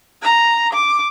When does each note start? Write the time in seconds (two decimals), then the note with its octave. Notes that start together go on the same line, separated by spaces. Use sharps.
0.22 A#5
0.73 D6